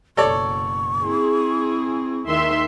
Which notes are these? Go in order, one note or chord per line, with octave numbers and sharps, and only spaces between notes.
F#1 B2 A4 C#5 D5 C#6
C4 E4 G#4
D#2 D#3 E5 C6